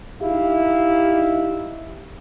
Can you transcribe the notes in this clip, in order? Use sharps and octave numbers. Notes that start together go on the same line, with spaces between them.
D#4 E4 G4 F5